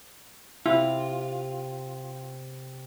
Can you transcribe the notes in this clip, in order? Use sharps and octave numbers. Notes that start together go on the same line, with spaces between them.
C3 E4 F4